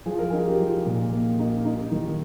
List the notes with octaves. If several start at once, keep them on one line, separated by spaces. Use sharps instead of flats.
F3 G#4
A#4
D#4 G#4
G4
F3
A#2
A#3
D#4
D#4
D#3